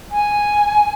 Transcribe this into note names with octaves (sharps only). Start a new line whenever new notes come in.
G#5